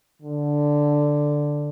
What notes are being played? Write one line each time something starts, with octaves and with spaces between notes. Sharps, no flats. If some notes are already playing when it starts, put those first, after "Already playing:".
D3